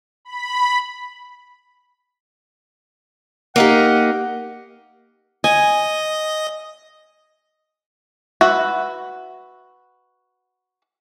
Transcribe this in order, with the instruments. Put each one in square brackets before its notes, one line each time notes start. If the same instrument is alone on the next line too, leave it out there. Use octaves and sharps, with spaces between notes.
[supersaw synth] B5
[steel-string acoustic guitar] A#3 D#4 G4 [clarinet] F#5
[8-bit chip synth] D#5 [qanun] G#5
[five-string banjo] F#4 B4 E5